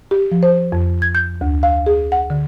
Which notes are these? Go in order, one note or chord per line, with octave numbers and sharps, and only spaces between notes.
G4
F3
C5
F2
G#6
G6
D2
F5
G#4
F#5
D3